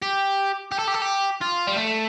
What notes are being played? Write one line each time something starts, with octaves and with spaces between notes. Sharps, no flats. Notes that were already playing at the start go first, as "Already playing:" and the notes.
G4
G4
A4
G4
A4
G4
F4
G3
A3